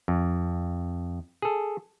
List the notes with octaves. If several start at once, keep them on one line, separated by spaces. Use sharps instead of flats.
F2
G#4 A4